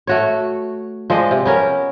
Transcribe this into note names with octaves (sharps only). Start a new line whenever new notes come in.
A3 F#4 C#5
F3 G#3 D5 D#5
C3
B3 C#4 A#4